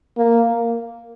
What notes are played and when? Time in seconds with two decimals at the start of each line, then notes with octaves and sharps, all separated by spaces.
0.18 A#3